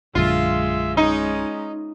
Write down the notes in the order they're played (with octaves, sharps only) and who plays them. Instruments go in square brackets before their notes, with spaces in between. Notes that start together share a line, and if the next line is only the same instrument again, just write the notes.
[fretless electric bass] A#1 F#2 D3 [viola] G#3 E5 [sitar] F4
[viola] G#3 C#4 [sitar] D#4